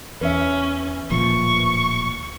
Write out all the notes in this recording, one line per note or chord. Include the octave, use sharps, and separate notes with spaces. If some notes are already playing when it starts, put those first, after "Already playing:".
E2 C#4 B4 E5
D1 A#2 F3 C#6